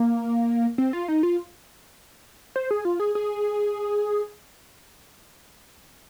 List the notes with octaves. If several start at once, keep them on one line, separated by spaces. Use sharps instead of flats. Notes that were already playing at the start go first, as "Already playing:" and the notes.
Already playing: A#3
C4
F4
D#4
F4
C5
G#4
F4
G#4
G#4